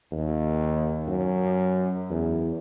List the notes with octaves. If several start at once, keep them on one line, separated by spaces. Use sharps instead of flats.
D#2
F#2
E2